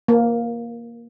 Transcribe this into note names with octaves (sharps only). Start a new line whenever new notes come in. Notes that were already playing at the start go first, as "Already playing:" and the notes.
A#3